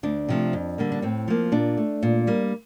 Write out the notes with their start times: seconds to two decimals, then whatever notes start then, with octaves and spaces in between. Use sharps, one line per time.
0.03 D2 D4
0.29 C3 F3 A3
0.53 F2
0.78 D3 G3 A#3
0.92 D4
1.02 A2 C4
1.28 F3 A#3
1.52 A#2 D4
1.77 A3
2.03 A#2
2.27 G3 A#3